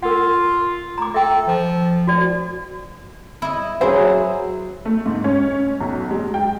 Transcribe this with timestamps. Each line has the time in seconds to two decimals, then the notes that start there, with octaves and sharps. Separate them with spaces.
0.03 F4 A#4 F#5
0.98 A#5 D6
1.14 A4 E5 G5
1.48 F3
2.07 F#4 D5
3.42 E4 D#5
3.81 F#3 E4 G#4 C5
4.85 A3
5.06 G#2
5.24 C#4
5.81 B1
6.11 G#3
6.34 G5